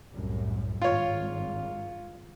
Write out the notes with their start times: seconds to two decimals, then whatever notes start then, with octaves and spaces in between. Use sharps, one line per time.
0.12 C2 F#2 A2
0.82 G#1 G2 F4 C#5